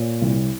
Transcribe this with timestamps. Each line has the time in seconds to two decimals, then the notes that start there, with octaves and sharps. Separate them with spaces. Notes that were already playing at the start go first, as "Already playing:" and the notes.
Already playing: A#2 C#5
0.22 C2